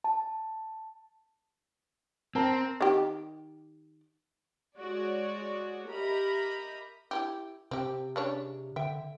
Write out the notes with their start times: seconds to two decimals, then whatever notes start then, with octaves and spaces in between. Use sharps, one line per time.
0.04 A5
2.35 C4 A#4 A5 A#5
2.81 D#3 G4
4.79 G#3 F#4 C#5 D5
5.89 G4 A#4 D#5 E5 A#5 B5
7.11 E4 F4 G4
7.71 C3 C4 G4
8.16 C#3 D4 C#5
8.76 D3 E5 G5